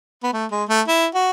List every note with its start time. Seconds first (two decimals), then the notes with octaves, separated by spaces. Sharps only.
0.23 B3
0.33 A3
0.51 G#3
0.69 A3
0.87 E4
1.14 F#4